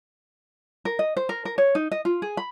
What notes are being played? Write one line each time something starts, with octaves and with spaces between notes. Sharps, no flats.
A#4
D#5
C5
A#4
A#4
C#5
D#4
D#5
F4
G#4
B5